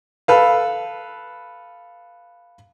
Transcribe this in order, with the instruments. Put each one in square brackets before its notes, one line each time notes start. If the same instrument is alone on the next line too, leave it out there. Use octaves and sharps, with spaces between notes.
[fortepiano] A4 B4 F5